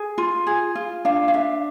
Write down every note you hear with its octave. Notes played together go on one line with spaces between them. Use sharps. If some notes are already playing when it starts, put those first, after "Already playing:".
Already playing: G#4
F4
G#4
F4
D4 F5
F5
D4 E5